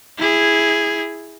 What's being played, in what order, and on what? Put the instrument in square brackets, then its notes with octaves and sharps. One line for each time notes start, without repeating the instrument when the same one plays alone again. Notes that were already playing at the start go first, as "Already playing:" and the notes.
[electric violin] E4 G#4